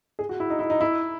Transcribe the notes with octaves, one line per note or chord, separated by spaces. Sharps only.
G#4
F#4
E4
D#4
E4
D#4
E4